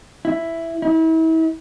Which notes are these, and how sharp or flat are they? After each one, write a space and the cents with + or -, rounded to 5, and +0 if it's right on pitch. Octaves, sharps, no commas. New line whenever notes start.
E4 +5
E4 -35